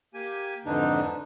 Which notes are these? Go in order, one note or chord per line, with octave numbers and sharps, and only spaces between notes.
A#3 G4 G#5
F2 G#2 D3 E3 D4 D#4